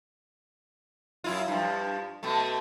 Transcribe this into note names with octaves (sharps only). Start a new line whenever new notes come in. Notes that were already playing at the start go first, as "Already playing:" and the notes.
F#2 E4 F4
G2 F3
B2 A3